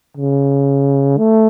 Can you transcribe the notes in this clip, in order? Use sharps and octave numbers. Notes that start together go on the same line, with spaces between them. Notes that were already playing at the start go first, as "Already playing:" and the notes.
C#3
A3